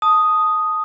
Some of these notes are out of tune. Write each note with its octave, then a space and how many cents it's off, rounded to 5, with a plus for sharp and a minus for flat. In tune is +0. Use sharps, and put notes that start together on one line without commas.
A5 +0 D#6 +0